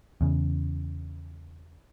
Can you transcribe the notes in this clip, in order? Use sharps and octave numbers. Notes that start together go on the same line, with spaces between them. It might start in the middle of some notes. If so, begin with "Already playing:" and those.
E2 C#3